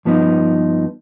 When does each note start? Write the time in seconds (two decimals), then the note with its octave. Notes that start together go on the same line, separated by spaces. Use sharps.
0.05 G2 F3 B3 D#4